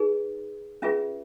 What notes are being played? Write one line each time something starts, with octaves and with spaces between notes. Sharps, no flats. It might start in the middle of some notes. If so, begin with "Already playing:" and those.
Already playing: D#4 G#4 B4
C#4 F4 G#4 B4 E5